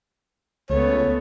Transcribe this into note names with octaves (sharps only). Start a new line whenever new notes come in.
C#2 A3 B3 C#5